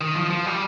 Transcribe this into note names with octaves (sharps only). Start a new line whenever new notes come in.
D#3
F3
F3
G3